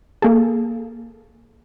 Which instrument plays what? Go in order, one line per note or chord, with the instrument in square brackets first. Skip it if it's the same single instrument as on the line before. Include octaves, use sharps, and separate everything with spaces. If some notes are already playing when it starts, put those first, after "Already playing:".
[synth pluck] A#3 G#4 A4